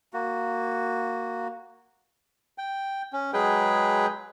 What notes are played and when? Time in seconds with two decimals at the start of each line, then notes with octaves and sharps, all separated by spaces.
0.13 A#3 F#4
2.58 G5
3.13 C#4
3.33 F#3 G#3 G#4 B4 G5